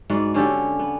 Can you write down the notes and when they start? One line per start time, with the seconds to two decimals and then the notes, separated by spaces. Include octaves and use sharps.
0.10 G#2 B3 F#4 D5
0.34 D3 C#4 G4 A4
0.79 B3